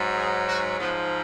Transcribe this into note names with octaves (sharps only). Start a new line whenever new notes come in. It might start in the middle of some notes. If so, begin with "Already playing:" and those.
Already playing: G#2 F#3
G#4
F#4
G#2 F3 B3